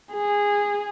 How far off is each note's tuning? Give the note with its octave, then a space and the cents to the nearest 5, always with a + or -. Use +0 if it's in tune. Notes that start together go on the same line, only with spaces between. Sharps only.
G#4 -15